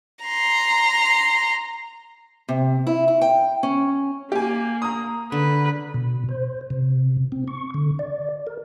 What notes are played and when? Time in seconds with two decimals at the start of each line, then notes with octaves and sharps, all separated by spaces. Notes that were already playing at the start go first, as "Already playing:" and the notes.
0.24 A#5 C6
2.49 C3
2.87 E4
3.08 E4
3.21 G5
3.63 C#4
4.32 A#3 G4 G#5
4.82 A#5 D#6
5.32 D3 B4
5.94 B2
6.29 C5
6.70 C3
7.32 C4
7.48 C#6
7.74 D3
7.99 D5
8.47 A#4